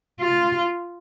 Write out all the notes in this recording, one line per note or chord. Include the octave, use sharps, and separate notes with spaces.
F4